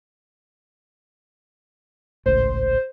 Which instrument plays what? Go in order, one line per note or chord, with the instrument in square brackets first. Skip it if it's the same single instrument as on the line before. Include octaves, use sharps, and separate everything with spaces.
[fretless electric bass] G#1 C#2 A2 [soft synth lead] C5